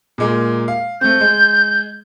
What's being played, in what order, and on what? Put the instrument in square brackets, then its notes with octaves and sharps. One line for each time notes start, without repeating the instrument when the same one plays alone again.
[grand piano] A#2 G#3 A#3
F5
[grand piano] A3 C4 [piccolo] G6
[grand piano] G#3